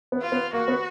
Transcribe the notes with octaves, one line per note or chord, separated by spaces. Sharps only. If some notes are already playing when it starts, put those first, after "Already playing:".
B3
F4
B3
A#3 F#4
B3